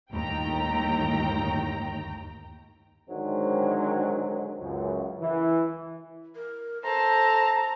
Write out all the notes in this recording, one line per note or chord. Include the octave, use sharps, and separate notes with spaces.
G1 D#2 A2 G5 A#5
G#2 D3 D#3 F#3 G#3 C4
C#2 F#2
E3
A#4
A4 C5 A5 A#5